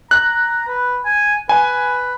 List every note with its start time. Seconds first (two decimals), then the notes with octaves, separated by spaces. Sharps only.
0.11 A#5 F#6
0.68 B4
1.05 G#5
1.49 B4 G#5